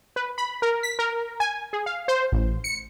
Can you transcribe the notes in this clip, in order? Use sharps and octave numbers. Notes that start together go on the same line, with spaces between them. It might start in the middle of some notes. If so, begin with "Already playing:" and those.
B4
B5
A#4
B6
A#4
G#5
G#4
F5
C5
A1
C#7